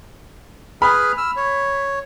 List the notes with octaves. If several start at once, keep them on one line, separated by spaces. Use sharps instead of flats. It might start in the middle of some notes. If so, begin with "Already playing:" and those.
G#4 B4 B5 F6
E6 F6
C#5